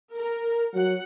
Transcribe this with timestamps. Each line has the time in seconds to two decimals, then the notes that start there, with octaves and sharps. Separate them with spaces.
0.14 A#4
0.74 F#3 F#5